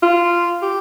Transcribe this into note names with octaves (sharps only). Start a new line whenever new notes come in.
F4
G4